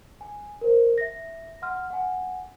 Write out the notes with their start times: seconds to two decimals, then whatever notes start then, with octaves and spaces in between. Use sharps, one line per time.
0.21 G#5
0.61 A#4 C5
0.98 E5 A#6
1.62 F#5 C6 F6
1.91 F#5 G#5